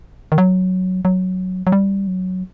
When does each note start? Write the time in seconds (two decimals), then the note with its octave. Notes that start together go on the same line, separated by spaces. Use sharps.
0.32 D#3
0.38 F#3
1.05 F#3
1.67 F#3
1.72 G3
2.08 F#3